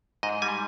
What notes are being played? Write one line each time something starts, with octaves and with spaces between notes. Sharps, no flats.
G#2 D#5
G3 G#5